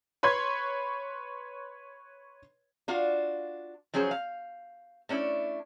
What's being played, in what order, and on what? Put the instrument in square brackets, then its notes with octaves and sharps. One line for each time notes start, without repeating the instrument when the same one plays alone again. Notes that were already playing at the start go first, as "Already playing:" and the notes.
[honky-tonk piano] B4 C#5 B5 C6 G#6
[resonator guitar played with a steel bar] D4 F4 F#4 F5
F3 F#3 C#4 G#4 C5
F5
A3 C#4 D4 E4